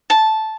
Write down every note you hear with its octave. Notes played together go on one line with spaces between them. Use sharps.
A5